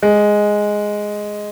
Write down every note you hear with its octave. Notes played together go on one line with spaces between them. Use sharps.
G#3